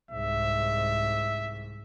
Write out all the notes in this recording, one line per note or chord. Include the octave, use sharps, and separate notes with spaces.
C2 G#2 E5